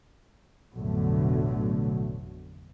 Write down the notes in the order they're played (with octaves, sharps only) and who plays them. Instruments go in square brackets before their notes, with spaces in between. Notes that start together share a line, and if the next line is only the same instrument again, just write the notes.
[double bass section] A1 F2 B2 D3 F#3 A3